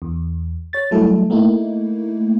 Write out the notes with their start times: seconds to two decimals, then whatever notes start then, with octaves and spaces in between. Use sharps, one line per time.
0.02 E2
0.73 C#5 A6
0.91 F#3 G3 A3 E4 A4
1.30 A3 A#3 D#4 E4